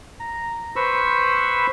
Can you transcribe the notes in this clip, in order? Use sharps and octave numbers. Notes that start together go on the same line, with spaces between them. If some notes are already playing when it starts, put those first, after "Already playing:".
A#5
B4 C5 B5 C#6 E6